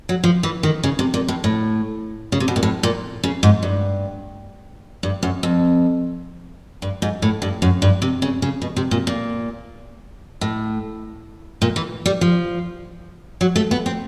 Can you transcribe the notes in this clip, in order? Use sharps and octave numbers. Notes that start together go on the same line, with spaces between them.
F#3
F3
E3
D#3
C#3
C3
A#2
A2
A2
C#3
C3
B2
A#2
A2
A#2
C#3
G#2
G2
G2
F#2
F2
G2
G#2
A2
G2
F#2
G2
C3
C#3
C#3
B2
C3
A#2
A#2
A2
A#2
E3
G3
F3
F#3
A3
B3
C4